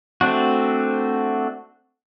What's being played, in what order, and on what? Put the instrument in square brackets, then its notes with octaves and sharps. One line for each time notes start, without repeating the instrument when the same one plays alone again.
[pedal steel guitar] A3 C4 D4 F#4